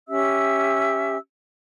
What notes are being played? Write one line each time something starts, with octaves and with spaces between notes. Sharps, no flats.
C#4 G4 E5 E6